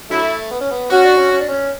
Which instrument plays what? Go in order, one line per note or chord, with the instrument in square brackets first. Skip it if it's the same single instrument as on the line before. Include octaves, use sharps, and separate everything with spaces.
[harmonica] D3 F#3 A3 [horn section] E4
[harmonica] B3
C#4
B3
[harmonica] C#4 [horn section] F#4
[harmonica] D4
C#4
C#4
D4
C#4